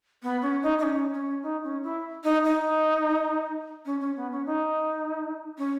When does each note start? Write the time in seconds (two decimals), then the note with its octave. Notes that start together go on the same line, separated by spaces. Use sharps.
0.23 B3
0.42 C#4
0.63 D#4
0.79 D#4
0.83 C#4
1.13 C#4
1.43 D#4
1.64 C#4
1.83 E4
2.24 D#4
2.44 D#4
3.86 C#4
4.01 C#4
4.17 B3
4.32 C#4
4.46 D#4
5.58 C#4